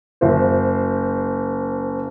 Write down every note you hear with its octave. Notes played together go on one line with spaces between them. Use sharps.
F#1 C5